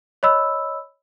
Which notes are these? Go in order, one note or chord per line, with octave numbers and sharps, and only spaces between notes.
C#5 D#5 B5 E6